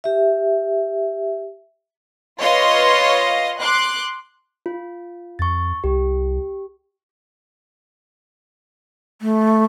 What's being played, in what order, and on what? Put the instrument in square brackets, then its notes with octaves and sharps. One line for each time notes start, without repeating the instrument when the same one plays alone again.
[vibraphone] G4 E5
[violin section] F4 B4 C#5 D#5 F5 C6
C6 D6 F#6
[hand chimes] F4
[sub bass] F2 [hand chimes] C#6 A6
[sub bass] C2 [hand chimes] G4
[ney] A3